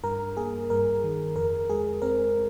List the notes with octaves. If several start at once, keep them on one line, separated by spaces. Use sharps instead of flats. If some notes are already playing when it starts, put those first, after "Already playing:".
G2 A#4
A#3 G#4
G2 A#4
D#3
F2 A#4
G#3 G#4
C4 A#4